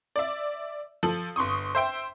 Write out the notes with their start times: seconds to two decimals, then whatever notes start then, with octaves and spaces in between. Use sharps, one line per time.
0.16 D5 E5
1.03 F3 A4 F#7
1.36 G1 C6 C#6 D#6
1.75 C5 E5 G5